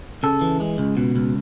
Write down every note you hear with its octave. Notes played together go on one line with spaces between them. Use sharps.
C#3 A4
E3
G#3
C#2
B2
C#2